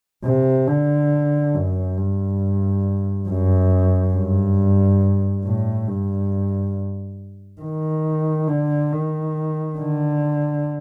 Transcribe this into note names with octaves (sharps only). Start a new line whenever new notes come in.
C3
D3
F#2
G2
F#2
G2
A2
G2
D#3
D3
D#3
D3